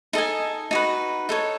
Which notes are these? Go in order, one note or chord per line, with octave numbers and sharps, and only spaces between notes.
D#4 A4 D#5 G#5
D#4 F#4 B4
D#4 A4 C#5